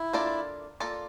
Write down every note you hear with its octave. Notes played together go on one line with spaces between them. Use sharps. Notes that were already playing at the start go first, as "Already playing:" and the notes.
Already playing: E4
A#3 D4 F4 A4 D5
A#3 F4 A4 D5